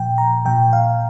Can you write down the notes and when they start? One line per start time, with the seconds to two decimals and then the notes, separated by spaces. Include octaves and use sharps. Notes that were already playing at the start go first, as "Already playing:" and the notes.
Already playing: A#2 F3 G5
0.18 A#5
0.45 A#2 F3 G5
0.73 F5